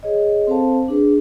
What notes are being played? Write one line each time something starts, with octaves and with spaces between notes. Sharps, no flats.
G#4 C#5 D#5
C4 A4 C5 F5 A5
D4 G#4 B4